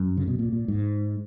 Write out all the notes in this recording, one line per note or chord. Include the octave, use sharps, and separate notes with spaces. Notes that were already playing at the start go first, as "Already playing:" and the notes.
Already playing: F#2
C#3
B2
A#2
A#2
G#2